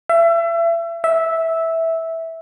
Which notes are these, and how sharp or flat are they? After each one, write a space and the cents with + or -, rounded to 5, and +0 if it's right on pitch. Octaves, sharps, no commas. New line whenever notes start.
E5 +30
E5 -10